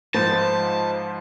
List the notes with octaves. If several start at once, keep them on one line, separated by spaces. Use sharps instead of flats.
G#2 F3 C5 A5 B5